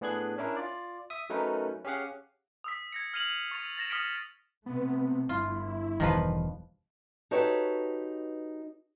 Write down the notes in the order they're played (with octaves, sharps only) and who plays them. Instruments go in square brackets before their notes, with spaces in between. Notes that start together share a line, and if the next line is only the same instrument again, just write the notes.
[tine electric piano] A2 B3 D4 G#4 F#6 G#6
C#4 D4 E4 A#4
F4 D5
E5 D#6
F#3 A3 C#4 D#4 A#4 B4
C#4 G4 G#4 F5 F#5
[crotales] D#6 E6 B6
G#6 A#6 C#7
F6 G#6 C7 D#7 F7 F#7
C#6 A6 F7
A6 A#6 E7
D#6 F6 A6 B6 C#7 D7
[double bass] C3 A3 [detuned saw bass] B3
[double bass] G1 [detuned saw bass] E4 [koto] F4
[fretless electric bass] E1 E2 G3 [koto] D#3 F3 B4
[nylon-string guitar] D#4 F#4 G4 A4 B4 C#5